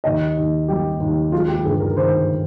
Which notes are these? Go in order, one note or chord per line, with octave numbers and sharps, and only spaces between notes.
D#2 D#5
D#2
G3 G4
D#2
G#3 F4
G4
G1 G#4
A#4
D#3 C5